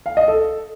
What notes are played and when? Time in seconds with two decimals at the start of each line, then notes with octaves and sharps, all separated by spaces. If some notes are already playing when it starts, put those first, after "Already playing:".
0.06 F5
0.17 D#5
0.28 A4